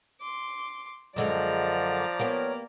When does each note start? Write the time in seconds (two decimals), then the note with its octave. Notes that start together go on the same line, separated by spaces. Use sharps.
0.21 C6 D6
1.16 F#2 D3 F3 G#3 D5 D#5 A#5
2.19 A#3 B3 G4 C#5